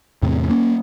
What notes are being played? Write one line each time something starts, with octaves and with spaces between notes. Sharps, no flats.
E2 A2 C3
A#3 C#4